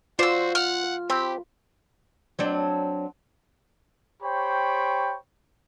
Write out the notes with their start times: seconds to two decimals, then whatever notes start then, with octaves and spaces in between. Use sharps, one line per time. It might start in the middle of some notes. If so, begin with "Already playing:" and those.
0.19 F4 F#4 C5 D5 E6
0.55 F#5 F6
1.10 C4 G4 B5
2.39 F#3 C4 D4
4.22 G4 C5 C#5 G5 B5 C#6